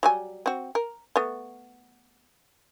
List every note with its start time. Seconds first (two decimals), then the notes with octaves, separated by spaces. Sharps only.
0.03 F#3 G3 G#5
0.46 C4 F#4
0.75 A#4
1.16 A3 B3